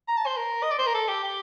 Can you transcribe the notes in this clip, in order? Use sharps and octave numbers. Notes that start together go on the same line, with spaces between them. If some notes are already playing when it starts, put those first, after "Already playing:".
A#5
A5
C5
A#4
D#5
D5
C5
A#4
A4
G4
G4